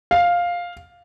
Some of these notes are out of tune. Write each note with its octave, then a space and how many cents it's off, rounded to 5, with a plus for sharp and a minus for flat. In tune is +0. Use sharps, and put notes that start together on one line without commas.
F5 +5